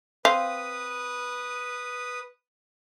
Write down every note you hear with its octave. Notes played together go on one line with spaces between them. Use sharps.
C4 B4 F5 D#6